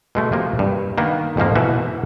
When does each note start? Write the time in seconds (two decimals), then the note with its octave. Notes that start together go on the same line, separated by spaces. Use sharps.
0.15 B2 G#3 A3
0.32 C3 F3 A#3
0.59 G2
0.98 D#3 A#3 B3
1.37 F2 G#2 F3 A#3
1.55 B2 E3 F#4 E5